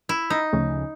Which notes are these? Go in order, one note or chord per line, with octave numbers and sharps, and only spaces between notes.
E4
D#4
D2 C#3 F3 A3 C#4